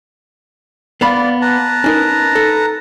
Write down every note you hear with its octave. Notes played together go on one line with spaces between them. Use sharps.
B3 D5 F5 B5
B4 A5 A#5
C#4 D#4 A#4
A4